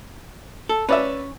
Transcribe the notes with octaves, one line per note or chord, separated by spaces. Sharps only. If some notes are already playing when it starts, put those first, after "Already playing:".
A4
C#4 B4 D5 E5